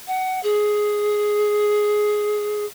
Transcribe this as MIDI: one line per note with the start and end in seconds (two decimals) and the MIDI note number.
0.07 0.40 78
0.43 2.65 68